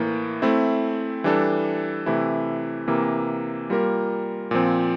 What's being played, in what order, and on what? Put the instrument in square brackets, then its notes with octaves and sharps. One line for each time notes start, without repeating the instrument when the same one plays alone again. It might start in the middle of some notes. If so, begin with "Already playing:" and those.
Already playing: [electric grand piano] A2 E3 A#3
A3 C4 E4
E3 G3 D4 A4
C3 E3 A3 E4
C3 E3 A#3
G3 A#3 F4 A#4
A#2 F3 C4